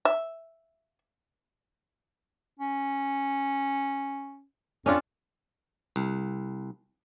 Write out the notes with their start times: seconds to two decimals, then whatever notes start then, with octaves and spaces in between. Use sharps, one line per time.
0.05 E5
2.59 C#4
4.86 F2 C#4 D4 F4
5.96 C2